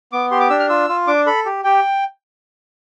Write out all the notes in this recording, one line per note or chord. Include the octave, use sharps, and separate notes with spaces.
B3 D6
G4 C6
D6
D4 E6
F6
F4 E6
F4
D4 D6
A4 B5
G4
G4 G5